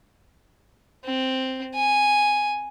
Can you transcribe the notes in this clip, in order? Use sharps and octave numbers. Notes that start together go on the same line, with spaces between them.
C4
G#5